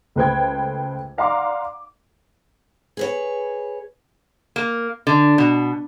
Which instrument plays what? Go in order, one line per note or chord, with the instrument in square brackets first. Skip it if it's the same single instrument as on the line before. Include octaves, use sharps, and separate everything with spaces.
[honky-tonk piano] C#2 A3 B4 C5 G5 G#6
D5 F5 F#5 A#5 C6 D6
[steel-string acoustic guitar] G#4 B4 C#5
[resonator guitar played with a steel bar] A#3
D3
B2